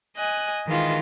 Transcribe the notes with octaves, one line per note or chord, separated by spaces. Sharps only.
D#5 G#5 F#6
D#3 E3 G#3 F4